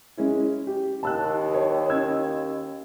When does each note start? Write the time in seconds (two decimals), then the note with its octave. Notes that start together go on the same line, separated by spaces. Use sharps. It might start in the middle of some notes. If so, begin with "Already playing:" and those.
0.17 G#3 C#4 E4
0.67 G4
1.03 D#2 A5 E6 F#6
1.54 C#5
1.89 C#4 E6 G#6